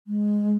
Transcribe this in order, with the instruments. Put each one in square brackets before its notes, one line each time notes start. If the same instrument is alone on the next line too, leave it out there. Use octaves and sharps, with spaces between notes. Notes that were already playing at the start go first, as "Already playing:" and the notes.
[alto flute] G#3